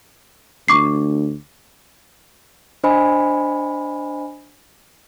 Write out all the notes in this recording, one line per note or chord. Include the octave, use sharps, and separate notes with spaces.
D2 C#6 D6 C7
D4 C5 D#5 G#5 B5